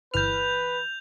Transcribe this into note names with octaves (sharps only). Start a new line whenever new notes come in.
G1 E3 B4 F6 G6 F7